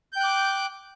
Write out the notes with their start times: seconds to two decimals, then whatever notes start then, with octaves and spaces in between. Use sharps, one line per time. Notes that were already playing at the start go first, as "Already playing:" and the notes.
0.13 G6
0.16 G5
0.20 F#6
0.24 D6